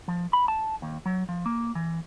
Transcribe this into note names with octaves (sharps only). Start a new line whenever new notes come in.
F3
B5
A5
D#2
F#3
F3
A#3
E3